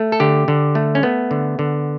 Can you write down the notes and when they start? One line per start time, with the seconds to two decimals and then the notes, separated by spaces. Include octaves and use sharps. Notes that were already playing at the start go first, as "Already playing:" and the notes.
Already playing: A3
0.12 A4
0.20 D3 G4
0.48 D3
0.75 A3
0.95 C#4
1.03 A3 B3
1.31 D3
1.59 D3